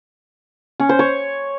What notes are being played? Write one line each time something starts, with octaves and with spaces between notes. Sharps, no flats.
C#4
C5
C#5